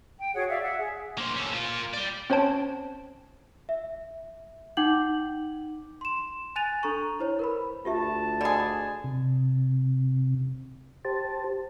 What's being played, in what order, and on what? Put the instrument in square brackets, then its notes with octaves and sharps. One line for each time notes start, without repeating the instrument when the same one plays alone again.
[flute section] G5
F#4 G#4 C#5 F#5
D5 E5 F5
E5 F#5
G#4
[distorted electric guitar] A#3 C5
C#4 A4
A#3 F4
D5 G5
[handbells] C4 C#4 C5 C#5 A5 D7
[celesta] E5
D#4 F#5 G5 D6 G6 F#7
C6 E7
G#5 F#6 A6 D#7 F7
D4 A4 A#5 C#6
E4 C5 C#5
A#4 B4 B5
[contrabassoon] D2 [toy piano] F4 G4 E5 [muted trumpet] A5
[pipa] D3 G#4 [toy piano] D5 D#5 B5
[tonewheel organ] C3
G4 C5 A5